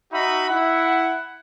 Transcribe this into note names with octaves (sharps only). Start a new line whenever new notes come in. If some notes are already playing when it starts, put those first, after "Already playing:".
D#4 F#4 E5 B5
E4 F#5